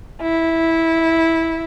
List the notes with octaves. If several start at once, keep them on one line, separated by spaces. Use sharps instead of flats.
E4